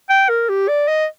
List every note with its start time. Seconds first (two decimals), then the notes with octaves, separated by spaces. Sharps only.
0.10 G5
0.29 A#4
0.49 G4
0.68 D5
0.88 D#5